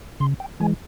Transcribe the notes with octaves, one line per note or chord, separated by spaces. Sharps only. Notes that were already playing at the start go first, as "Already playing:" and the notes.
C#3 C6
G5
E3 G#3 G#5